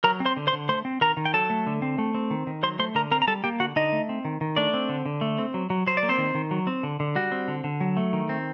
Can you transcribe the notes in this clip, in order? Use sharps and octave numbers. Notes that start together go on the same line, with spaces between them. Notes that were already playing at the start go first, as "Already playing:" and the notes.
F#3 A#4 A#5
C4
C5 C6
D3
C5 C6
D3
A3 C5 C6
C4
D#3 A#4 A#5
D#3
G5
F#3 A4 A5
A3
D3
C4
A3
C4
D#3
D#3
F#3 C5 C6
A3 C5 C6
D3 A#4 A#5
C4 A#4 A#5
A#5
G3 A4 A5
A#3 G4 G5
D3 F#4 F#5
D3 D#4 D#5
A3
C4
D#3
D#3
A3 D4 D5
C4
D3
D3
A3
C4
F#3
F#3
F#3 C5
D5
A#3
C4 C5
D#3
D#3
F#3
C4
D3
D3
G3 F#4
C4
D3
D3
F#3
A3
D#3
C4